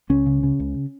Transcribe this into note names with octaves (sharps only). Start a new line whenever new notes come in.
C#2 C#4
C#3
C#3
C#2